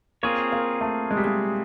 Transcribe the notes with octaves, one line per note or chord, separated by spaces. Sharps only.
A#3 C4 F4 G#4 C#5
A#3
A3
G#3
G3
G#3